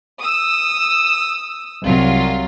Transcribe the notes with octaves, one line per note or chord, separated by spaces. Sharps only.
D#6 E6
C2 F#3 F4